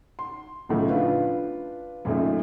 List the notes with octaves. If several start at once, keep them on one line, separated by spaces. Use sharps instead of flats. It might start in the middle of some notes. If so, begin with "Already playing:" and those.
C6
B1 A2 C#3 F3
D4 F4 B4
F#2 A#2 A3 D#4